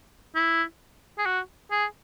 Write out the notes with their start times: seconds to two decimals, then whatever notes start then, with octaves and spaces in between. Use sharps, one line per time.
0.35 E4
1.18 G#4
1.26 F#4
1.71 G#4